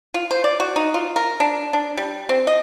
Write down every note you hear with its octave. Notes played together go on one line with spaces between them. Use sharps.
F4
C5
D5
F#4
D#4
F4
A#4
D4
D4
G3
C4
D#5